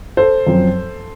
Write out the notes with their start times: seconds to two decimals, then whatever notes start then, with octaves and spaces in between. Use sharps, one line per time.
0.17 A4 C5
0.47 F#2 F3 C4